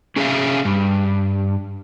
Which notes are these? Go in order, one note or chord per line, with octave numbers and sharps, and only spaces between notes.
C#4 G#4 C5 D5 E5 F5
G2